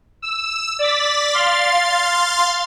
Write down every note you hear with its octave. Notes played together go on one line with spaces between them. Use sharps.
E6
D5 A6 B6
F5 C6 A6